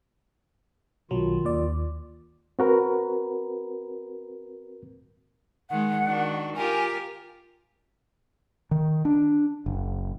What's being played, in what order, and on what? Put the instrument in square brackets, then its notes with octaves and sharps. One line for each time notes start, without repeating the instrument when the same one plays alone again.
[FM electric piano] B1 F#3 [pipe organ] D#3 F4
[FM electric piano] D#2 D5
[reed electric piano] C4 F#4 A#4 B4
[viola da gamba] D#3 G#3 [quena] F#5
[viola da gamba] D#3 D4 F#4
[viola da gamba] F4 G4 A#4 [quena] G#5
[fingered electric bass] D#3
D4
F#1